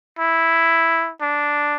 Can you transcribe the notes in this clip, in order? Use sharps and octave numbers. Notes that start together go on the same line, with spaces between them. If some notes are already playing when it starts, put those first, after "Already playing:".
E4
D4